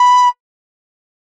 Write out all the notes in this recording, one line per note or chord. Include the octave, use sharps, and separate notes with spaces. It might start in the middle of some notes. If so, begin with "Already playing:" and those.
Already playing: B5